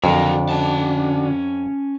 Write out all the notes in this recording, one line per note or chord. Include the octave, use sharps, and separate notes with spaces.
F2 D3 F#3 A#3 D4 F#4
C#4 A5